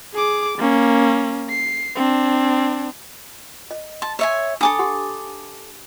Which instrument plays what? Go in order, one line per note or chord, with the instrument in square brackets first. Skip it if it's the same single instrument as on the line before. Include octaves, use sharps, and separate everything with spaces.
[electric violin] G#4 D6
A#3 C#4
C7
C4 D4
[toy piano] D#5
[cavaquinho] A5 [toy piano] C6
[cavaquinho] C#5 E5 G#5
[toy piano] D4 G#5 B5 [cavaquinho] A4 D6 D#6
[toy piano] G4 F#5 C6